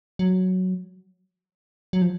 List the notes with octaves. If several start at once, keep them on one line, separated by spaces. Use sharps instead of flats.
F#3
F#3
F3